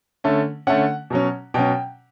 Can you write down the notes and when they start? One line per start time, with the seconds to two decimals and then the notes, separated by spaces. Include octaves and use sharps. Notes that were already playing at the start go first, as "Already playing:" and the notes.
0.24 D3 A3 C#4
0.67 D3 A3 C#4 F#5
1.10 B2 F#3 C#4
1.54 B2 F#3 C#4 G5